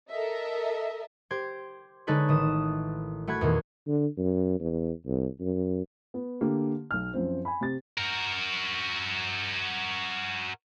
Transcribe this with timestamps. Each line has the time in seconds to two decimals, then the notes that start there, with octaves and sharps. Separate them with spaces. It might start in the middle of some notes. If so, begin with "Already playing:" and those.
0.11 A4 A#4 D#5 E5
1.31 G4 C5 G#6
2.07 D3 G#3 D#4 A4 B4 C#5
2.28 A1 D#3 D#6 E7
3.27 A3 F#4 F#5 B5 G#6
3.41 E2 A#2 D#3
3.87 D3
4.17 F#2
4.60 E2
5.07 C2
5.40 F#2
6.14 B3
6.41 D3 A#3 G4
6.91 B1 F6
7.14 F#2 F3 C4
7.45 G#5 B5
7.61 C3 A6
7.98 F#4 A#4